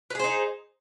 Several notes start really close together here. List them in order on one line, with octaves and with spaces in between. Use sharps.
B4 G#4 C5 D#4